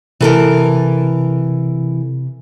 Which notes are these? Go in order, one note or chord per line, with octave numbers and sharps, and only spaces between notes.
C3 E3 A4 A#4